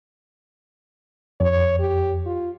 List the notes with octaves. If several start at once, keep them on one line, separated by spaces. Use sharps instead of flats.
F2 C#5
G4
F4